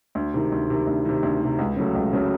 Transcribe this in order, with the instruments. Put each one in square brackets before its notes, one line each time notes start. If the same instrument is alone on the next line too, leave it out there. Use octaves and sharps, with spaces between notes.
[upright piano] D2
C3 D#3
D2
C3 D#3
D2
C3 D#3
D2
C3 D#3
C#2
C#3 F#3 A3
C#2
C#3 F#3 A3